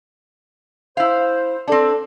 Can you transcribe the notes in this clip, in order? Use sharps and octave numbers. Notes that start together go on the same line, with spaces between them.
E4 C5 F5
C4 D4 A4 D5 A5